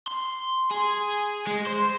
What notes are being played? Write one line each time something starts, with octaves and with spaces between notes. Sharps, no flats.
C6
G#4
G#3
C5